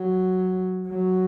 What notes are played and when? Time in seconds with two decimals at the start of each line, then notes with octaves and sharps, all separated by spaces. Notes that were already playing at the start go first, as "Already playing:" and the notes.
Already playing: F#3
0.88 F#3